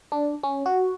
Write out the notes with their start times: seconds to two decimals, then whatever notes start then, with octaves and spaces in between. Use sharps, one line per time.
0.12 D4
0.43 C#4
0.66 F#4